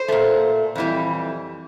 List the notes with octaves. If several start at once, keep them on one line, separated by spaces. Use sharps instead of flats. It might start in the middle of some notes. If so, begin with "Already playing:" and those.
Already playing: C5
A#2 A3
F2 E3 G3